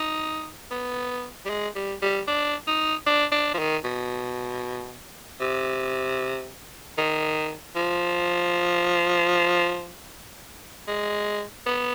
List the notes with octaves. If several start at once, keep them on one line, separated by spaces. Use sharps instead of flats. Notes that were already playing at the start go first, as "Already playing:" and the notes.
Already playing: D#4
B3
G3
G#3
G3
G3
D4
D#4
D4
D4
F3
D#3
B2
C3
D#3
F3
G#3
B3